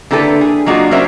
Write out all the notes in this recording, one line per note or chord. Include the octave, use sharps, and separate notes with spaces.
D3 A#3 E4 G4 A4 B4
G#4
F#3 G#3 A#3 D4 F4 F#4
F#3 C#4 D4 A#4 C5 E5